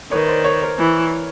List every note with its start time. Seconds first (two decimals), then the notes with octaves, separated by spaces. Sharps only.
0.11 D#3 B4 C#5
0.28 C5 D5
0.44 B4 C#5
0.62 A#4 C5
0.79 E3